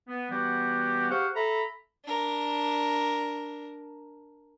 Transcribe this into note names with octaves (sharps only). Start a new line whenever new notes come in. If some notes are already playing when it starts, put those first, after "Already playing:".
B3
E3 G3 B3 F#4 G4
G4 G#4 C5 F5 F#5 C#6
A4 E5 A#5 B5
D4 A#4